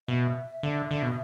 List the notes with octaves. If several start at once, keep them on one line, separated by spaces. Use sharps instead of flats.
B2 E5
D3
D3
B2